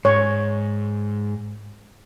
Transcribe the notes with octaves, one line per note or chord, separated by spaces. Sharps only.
G#2 C#5